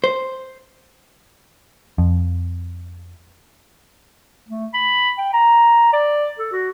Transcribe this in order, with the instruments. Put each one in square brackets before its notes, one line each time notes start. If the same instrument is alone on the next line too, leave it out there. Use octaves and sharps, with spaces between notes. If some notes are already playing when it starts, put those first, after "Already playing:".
[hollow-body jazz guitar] C5
[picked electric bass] F2
[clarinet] A3
B5
G5
A#5
D5
A4
F#4